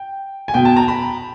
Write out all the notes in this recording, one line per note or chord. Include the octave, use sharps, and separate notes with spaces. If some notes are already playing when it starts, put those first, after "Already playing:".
Already playing: G5
G#5
B2 G5
A5
A#5
B5